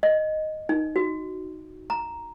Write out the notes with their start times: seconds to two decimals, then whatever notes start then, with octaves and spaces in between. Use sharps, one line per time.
0.03 D#5
0.69 D#4
0.96 F#4
1.90 A#5